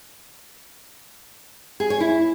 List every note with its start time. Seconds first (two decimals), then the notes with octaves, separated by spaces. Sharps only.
1.80 G#4
1.90 C#5
2.00 E4